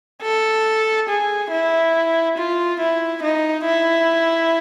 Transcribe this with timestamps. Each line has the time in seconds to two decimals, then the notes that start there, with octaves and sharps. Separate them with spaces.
0.23 A4
1.09 G#4
1.51 E4
2.37 F4
2.80 E4
3.23 D#4
3.66 E4